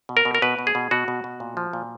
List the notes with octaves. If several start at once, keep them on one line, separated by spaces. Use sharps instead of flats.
B2
A#4
B2
A#4
B2 B4
B2
G#4
B2
B2 F#4
B2
B2
A#2
F3
A#2